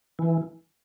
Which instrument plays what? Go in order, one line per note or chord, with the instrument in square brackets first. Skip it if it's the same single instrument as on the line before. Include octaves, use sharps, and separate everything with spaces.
[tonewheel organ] E3